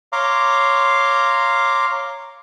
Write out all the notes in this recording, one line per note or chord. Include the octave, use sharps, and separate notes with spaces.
C#5 F5 A#5 C6 D6